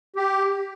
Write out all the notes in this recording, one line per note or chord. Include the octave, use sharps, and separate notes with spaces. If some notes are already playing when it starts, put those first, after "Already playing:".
G4